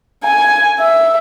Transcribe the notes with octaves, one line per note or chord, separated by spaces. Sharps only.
G#5
E5